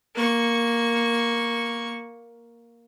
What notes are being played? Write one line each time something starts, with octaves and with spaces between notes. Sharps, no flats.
A#3 C#6